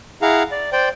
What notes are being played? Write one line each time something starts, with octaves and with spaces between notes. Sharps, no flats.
E4 G#4 F5 F#5 A#5
D5
C5 D5 G5